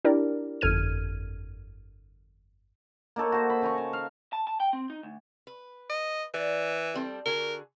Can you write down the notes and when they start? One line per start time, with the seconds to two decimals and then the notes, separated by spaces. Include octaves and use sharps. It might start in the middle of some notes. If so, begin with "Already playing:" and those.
0.05 D4 E4 G4 A#4 D5
0.61 G1 F2 A4 F6 G#6 D#7
3.16 A#3 D#4 A4 C#5
3.32 F#4 C5
3.50 B5
3.62 C#3 G#5 A#5 C#6
3.78 A5
3.93 F5
4.33 A5
4.47 A5
4.60 G5
4.73 C4
4.90 D#4
5.03 D2
5.47 B4
5.89 D#5
6.34 E3 D5
6.94 G3 C4 A4
7.26 D3 F#4 G#4 A#4